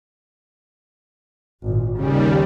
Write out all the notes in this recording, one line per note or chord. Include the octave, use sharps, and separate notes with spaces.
G#1 A#2
D#2 C#3 G3